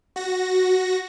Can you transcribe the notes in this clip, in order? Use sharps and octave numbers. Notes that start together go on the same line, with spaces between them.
F#4 A#6